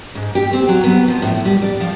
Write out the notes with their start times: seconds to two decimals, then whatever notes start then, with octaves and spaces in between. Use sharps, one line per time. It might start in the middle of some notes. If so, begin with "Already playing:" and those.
0.15 G#2
0.35 G4
0.53 C4
0.69 F#3
0.84 B3
1.08 F3
1.22 A2
1.45 G3
1.62 D5
1.80 F3